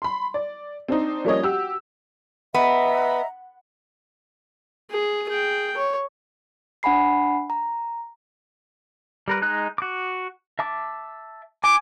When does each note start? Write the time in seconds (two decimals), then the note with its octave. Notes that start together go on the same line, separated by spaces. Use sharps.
0.02 B5 C6
0.34 D5
0.88 C4 D4 D#4
1.24 F3 G3 A#3 C#4 C#5 D#5
1.43 F#4 G4 E6
2.54 B3 D#5 E5 A#5
4.91 G#4
5.29 G#4 G5
5.77 C#5
6.83 D4 F#5 G#5 B5 C7
7.50 A#5
9.28 G3 A#4 B4
9.42 G#3 D#4 F#6
9.78 F#4 D6
10.59 E5 A5 D6
11.64 G#5 D6